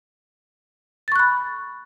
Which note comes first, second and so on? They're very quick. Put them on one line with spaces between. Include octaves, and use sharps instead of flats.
A6 C#6 F#6 B5